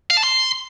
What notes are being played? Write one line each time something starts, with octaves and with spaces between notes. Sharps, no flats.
F5
A5
C6